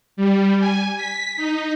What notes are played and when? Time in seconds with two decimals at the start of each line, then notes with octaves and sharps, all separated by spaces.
0.17 G3
0.59 G#5
0.96 B6
1.37 D#4